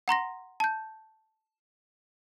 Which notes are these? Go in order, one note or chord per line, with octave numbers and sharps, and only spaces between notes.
F#5 A#5 C6 A#6
A5 G6